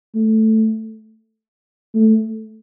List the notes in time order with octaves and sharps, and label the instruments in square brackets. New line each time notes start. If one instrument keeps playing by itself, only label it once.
[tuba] A3
A3